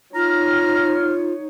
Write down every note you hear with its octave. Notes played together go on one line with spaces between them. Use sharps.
D#4 F4 C#5 A#5 F6